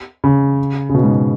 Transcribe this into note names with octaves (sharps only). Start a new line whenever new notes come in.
C#3
C#3
B2
G#2